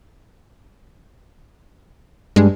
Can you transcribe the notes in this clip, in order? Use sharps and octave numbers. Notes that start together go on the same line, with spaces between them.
G2 G#3